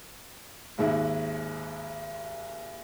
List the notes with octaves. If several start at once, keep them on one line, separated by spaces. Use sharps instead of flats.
G#1 D#2 G#2 E5